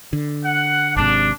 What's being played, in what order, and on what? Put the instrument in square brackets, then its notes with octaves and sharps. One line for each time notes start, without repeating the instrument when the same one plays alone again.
[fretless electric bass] D3
[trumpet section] F#5
[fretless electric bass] G#1 G#2 C3 [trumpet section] D4